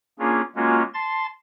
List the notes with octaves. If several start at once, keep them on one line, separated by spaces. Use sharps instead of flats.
A#3 C#4 D4 F4 G#4
G#3 A#3 C#4 F4 F#4
A5 C6 A6